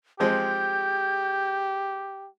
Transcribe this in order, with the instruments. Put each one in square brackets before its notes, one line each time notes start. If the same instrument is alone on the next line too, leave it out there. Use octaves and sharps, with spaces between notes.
[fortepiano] F3 G#3 C4 [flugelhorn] G4 [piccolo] G6